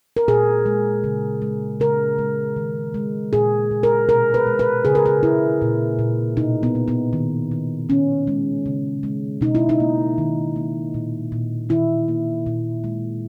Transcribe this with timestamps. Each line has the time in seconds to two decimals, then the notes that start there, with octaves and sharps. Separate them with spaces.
0.17 A#4
0.28 A#2 G#4
0.66 G#3
1.04 C#3
1.42 G#3
1.80 C#3 A#4
2.18 G#3
2.56 D#3
2.94 G#3
3.33 A#2 G#4
3.71 A#2
3.83 A#4
4.09 B2 A#4
4.34 B4
4.46 G#3
4.59 B4
4.85 C#3 G#4
4.95 A#4
5.06 G#4
5.23 C#3 E4
5.61 A#2
5.99 A#2
6.37 B2 D#4
6.63 B3
6.75 A#3
6.88 B3
7.13 D#3
7.51 D#3
7.89 D#3 C#4
8.27 G#3
8.66 C#3
9.03 G#3
9.41 B2 D#4
9.55 E4
9.69 D#4
9.80 A#3
10.18 D#3
10.56 A#3
10.94 A#2
11.32 A#2
11.69 D#3 E4
12.08 A#3
12.46 A#2
12.84 G#3